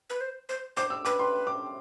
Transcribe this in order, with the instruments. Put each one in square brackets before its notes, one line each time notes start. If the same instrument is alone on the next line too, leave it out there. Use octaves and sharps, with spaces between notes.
[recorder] B4
C5
C5
[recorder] C5 [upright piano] D6
[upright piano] E6
[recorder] B4 [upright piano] D6
[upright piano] C6
D6